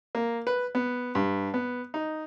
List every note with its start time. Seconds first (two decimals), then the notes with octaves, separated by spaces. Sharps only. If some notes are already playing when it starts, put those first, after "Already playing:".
0.15 A#3
0.47 B4
0.75 B3
1.15 G2
1.54 B3
1.94 D#4